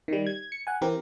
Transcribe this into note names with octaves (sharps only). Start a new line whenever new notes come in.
D#3 G3
G#6
C#7
F#5 G#5
E3 C4 G4 A#4